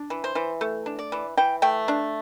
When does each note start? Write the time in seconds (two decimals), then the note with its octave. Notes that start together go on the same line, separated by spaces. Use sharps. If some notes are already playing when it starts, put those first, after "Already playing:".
Already playing: D4
0.10 E3
0.24 C5
0.35 E3
0.61 A3
0.86 D4
0.99 D5
1.12 E3
1.37 E3 G5
1.62 A3 G5
1.88 D4